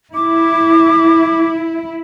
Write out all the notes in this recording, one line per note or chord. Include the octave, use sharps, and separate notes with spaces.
E4 D6